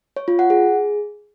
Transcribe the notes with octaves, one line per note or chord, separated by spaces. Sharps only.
C#5
F4
F#5
G#4